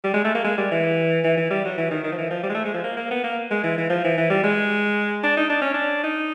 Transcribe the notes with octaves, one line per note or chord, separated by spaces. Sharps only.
G3
G#3
A3
A#3
G#3
G3
E3
E3
E3
G3
F#3
E3
D#3
D#3
F3
E3
F3
G3
G#3
A3
G#3
F3
A#3
A#3
B3
A#3
G#3
E3
E3
F3
E3
E3
G3
G#3
D4
D#4
D4
C#4
D4
D#4